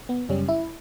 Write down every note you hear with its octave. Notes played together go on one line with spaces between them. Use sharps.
B3
F#2 C#3 G3 C#4
E4